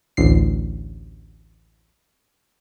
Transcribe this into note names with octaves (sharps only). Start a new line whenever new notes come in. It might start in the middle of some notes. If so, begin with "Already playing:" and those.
A1 D2 C7